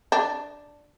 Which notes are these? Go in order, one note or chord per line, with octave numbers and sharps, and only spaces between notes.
D4